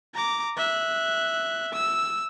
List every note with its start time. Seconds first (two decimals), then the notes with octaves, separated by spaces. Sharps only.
0.14 A#5 D6
0.57 E5 F#6
1.72 E6